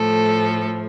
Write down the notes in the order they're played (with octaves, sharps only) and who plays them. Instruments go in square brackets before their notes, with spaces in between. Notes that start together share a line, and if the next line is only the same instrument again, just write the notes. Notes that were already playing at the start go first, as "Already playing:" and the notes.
Already playing: [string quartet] A2 F3 A3 A4